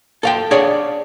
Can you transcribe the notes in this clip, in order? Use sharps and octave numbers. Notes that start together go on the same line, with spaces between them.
A4 F5 G5
D4 G#4 C#5 D5 F5